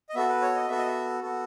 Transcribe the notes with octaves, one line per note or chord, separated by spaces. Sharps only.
D#5
B3 F#4 A4 E5
B4
C#5
D#5
B3 F#4 A4 E5
D#5
E5
B3 F#4 A4